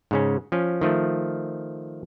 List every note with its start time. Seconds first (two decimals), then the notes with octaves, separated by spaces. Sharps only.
0.11 G#2 C#3 C#4
0.52 F3 C#4
0.81 D#3 F3 A3